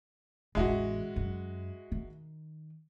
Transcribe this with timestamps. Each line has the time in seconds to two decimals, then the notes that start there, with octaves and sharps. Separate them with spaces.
0.55 A1 E2 G#3 E4 F#4
1.16 F#2
1.92 D#3